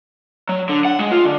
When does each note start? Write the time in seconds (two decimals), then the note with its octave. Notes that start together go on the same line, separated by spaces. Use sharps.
0.49 F#3
0.69 D3
0.85 F#5
0.99 G#3
1.12 F4
1.25 D3